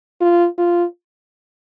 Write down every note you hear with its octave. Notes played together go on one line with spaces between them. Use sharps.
F4
F4